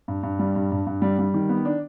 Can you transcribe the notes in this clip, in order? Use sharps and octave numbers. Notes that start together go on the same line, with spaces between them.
G2
G2
G3
G2
G2
G2
G3
G3
D#3
B3
D4